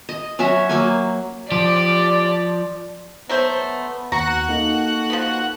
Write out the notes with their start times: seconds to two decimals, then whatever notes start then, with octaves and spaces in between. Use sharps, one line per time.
0.09 D#5
0.39 F#3 C#4 C#5 E5
0.69 F#3 A#3 G#5
1.52 F3 G4 D5
3.29 F#3 A3 B3 C5
4.12 D#2 F#4 F#5 A#5 F#6
4.49 A#3 D#4 A4
5.10 F3 B3